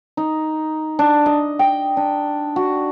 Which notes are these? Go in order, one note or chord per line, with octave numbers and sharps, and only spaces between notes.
D#4
D4
D#5
G5
D4
F#4